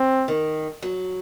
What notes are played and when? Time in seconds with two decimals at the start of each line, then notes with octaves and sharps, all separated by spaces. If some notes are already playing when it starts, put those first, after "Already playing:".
Already playing: C4
0.28 D#3
0.82 F#3